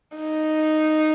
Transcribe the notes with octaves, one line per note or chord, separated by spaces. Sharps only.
D#4